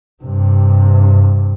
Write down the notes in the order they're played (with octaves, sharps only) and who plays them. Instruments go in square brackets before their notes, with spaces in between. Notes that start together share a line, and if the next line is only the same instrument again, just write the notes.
[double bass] G2 C3